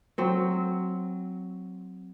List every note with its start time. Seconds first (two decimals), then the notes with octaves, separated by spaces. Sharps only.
0.18 F#3 C4